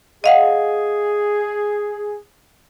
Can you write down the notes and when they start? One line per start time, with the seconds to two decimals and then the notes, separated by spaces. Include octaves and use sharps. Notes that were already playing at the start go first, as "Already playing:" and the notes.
0.24 G#4 D#5 F5 F#5